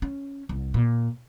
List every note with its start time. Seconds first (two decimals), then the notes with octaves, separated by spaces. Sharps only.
0.02 C#4
0.49 C2
0.74 A#2